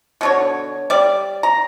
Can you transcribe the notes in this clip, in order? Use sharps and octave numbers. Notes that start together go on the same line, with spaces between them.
B2 D3 C#5
G3 D5
A#5